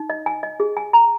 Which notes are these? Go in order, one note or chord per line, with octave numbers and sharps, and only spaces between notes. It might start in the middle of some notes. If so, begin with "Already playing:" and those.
Already playing: D#4
D#5
G#5
D#5
G#4
G#5
A#5